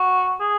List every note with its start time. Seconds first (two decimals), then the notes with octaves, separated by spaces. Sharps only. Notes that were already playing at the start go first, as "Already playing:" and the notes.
Already playing: F#4
0.40 G#4